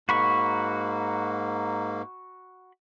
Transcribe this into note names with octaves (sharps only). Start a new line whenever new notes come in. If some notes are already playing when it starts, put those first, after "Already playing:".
G#2 A#3 F#4 B5 C#6